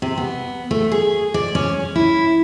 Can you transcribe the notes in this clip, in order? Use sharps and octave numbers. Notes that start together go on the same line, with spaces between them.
C3
B3
A3
G#4
D5
C#4
E4